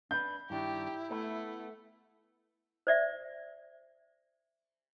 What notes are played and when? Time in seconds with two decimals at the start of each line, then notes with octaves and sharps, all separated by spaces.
0.11 D4 B4 G6
0.50 G2 D#3 D4 E4 G4
1.10 A3 B3 A#4 E5
2.87 C5 D5 E5